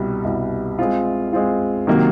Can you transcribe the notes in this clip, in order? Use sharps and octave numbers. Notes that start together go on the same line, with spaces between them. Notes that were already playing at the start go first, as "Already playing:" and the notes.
Already playing: C2 B2 G3
C2 B2 G3
G#3 C4 F4
G#3 C4 F4
C3 D#3 F#3 A#3